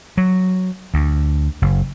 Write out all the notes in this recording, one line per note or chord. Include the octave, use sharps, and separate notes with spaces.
F#3
D2
F#1